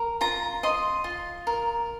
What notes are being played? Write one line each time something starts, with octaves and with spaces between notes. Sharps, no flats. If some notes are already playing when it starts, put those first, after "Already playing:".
Already playing: A#4
F4 A#5
D#5 C6
F4
A#4